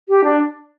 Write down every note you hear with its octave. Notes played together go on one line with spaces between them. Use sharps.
G4
D4